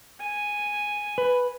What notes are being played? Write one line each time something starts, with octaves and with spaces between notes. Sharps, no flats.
G#5
B4